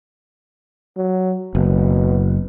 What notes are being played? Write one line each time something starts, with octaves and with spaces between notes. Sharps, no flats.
F#3
F#1 B2